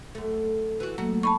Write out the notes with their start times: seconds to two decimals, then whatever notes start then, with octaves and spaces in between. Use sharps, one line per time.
0.15 F#2 A3
0.80 E3 F#4
0.98 F#3 A3 A#3 F#4
1.23 D#4 A5 B5 C#6